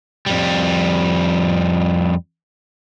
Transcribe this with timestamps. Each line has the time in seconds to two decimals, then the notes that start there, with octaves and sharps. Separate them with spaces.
0.26 F2 G3